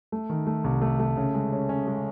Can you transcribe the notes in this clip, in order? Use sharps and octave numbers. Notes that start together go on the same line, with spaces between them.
A3
D#3
A3
C2
A3
A3
C#3
G#3
C#4
C#4
G#3